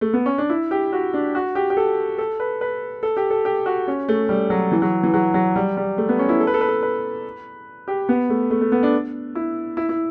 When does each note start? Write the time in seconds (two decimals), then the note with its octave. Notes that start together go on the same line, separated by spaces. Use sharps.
0.01 A3
0.14 B3
0.26 C#4
0.38 D4
0.50 E4
0.71 G4
0.93 F#4
1.14 D4
1.35 F#4
1.55 G4
1.70 G4
1.77 A4
2.18 A4
2.40 B4
2.61 B4
3.03 A4
3.17 G4
3.30 A4
3.45 G4
3.66 F#4
3.87 C#4
4.08 A3
4.29 G3
4.50 F#3
4.72 E3
4.82 F#3
5.03 E3
5.14 F#3
5.34 F#3
5.56 G3
5.77 G3
5.98 A3
6.09 B3
6.19 C#4
6.29 E4
6.40 A4
6.47 B4
6.54 A4
6.61 B4
6.69 A4
6.83 B4
7.88 G4
8.09 B3
8.29 A3
8.51 A3
8.61 A3
8.72 B3
8.83 D4
9.35 E4
9.77 E4
9.89 E4